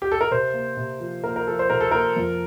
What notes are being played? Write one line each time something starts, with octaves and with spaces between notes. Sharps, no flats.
G4
A4
A#4
C3 C5
A#3
C3
F3
A#3 A#4
A#4
F3 A4
C5
C3 A#4
A4
A#3 A#4
F2